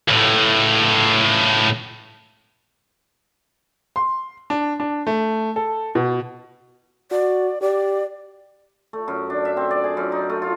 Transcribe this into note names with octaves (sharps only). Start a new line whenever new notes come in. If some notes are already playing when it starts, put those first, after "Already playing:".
C#2 A2
C6
D4
D4
A3
A4
B2
F#4 D5
G4 D5
A3
F#2
D4
E5
C4
D5
G#4
F#2
D#4
A3
F4